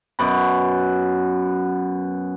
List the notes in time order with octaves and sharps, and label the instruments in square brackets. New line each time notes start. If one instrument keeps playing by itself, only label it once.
[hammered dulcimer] F#2 B2 B5